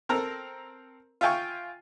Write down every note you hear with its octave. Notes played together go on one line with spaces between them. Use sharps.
C4 A4 A#4 A#5
F4 E5 F5 G5 G#5 C#6